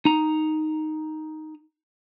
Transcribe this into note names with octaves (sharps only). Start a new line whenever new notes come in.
D#4 A#5